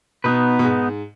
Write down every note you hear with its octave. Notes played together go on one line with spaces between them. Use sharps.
B2 B3 D#4 B4
B2
G#2